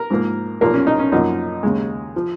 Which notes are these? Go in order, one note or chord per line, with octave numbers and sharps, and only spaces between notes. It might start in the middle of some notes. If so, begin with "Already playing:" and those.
Already playing: A#4
G#2 F3 A#3
B1 A#2 F3 A#3 A#4
C#4
D#4
C#4
F#2 F3 A#3 D#4
D#2 C#3 G#3
F3